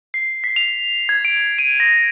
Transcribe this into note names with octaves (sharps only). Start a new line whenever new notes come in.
C7
B6
F7
G#6
D7
D#7
A#6